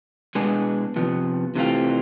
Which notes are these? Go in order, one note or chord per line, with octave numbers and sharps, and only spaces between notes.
B2 G#3 B3 D4 G#4
C3 F3 B3
C3 E3 A3 C4 F4